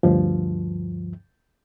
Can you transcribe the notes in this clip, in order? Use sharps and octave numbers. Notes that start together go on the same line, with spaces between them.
D2 G2 F3